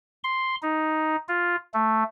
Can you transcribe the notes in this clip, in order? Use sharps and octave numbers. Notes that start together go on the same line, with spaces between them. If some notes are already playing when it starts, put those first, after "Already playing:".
C6
D#4
F4
A3